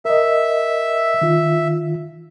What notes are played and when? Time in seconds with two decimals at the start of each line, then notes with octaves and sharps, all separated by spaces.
0.05 A#4 D#5 E5
1.21 D#3 F4